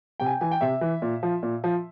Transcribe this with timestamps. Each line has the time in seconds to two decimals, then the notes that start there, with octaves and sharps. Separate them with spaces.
0.20 C3 G5
0.26 G#5
0.30 G5
0.41 E3 G#5
0.51 G5
0.61 C3 E5
0.81 E3
1.02 A#2
1.23 F3
1.43 A#2
1.64 F3